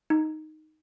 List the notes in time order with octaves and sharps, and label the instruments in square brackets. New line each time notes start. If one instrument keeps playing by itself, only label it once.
[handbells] D#4